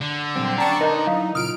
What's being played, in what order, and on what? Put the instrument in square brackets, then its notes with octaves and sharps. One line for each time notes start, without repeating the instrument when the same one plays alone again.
[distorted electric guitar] D3
[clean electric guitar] A#2 F#3 G3 [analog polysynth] C4
[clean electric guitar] C#4 G5 [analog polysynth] D4 A5 C#6 [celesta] A#5
[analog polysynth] D#4 [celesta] A#4 D#5 A#5 [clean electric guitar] B4
[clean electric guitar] F#3 E4 [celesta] F5
[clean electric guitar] A#2 C#3 [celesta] F4 D#6 [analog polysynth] F6 D7